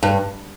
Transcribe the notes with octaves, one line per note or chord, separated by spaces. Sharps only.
G2